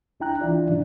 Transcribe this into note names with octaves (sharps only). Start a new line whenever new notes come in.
C#2 D4 E4 G5 A#5 F#6
C2 E3 D4 E4 F4 D5
G#2 B2 D#3 F3 D4 E4